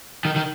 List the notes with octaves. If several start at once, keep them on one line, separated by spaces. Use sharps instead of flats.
D#3
D#3